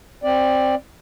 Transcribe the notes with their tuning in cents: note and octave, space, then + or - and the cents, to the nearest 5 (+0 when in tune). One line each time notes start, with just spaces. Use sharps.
C4 +10 D5 +10